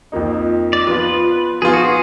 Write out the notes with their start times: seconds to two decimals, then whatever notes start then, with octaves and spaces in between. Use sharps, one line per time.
0.12 F2 F3 A#3 D#4
0.73 D5
0.87 F3 B3 F4 B4
1.62 F3 B3 F4 G#4
1.73 F#4
1.85 G#4